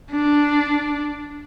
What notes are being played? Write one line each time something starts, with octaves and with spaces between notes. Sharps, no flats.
D4